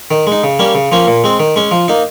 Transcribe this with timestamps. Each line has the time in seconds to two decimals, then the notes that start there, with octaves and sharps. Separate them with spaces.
0.11 D#3
0.27 G#3 D#4
0.44 C#3
0.59 G3 A#3 C#4
0.75 C#3
0.92 F3 A#3 C#4
1.07 A#2
1.24 G#3 C4
1.40 D#3
1.56 G#3 C#4
1.71 F3
1.88 A#3 D#4